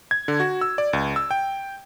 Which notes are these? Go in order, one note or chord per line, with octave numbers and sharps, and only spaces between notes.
G#6
D3
F#4
E6
D5
C#2
E6
G5